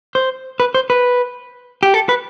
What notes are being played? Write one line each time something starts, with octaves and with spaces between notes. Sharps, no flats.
C5
B4
C5
B4
G4
A4
B4